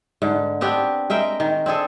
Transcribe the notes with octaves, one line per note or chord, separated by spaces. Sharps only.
G#2 D3
B3 C4 D4 G4
G#3 A#4 E5 G5
D#3
C4 D4 G#4 A4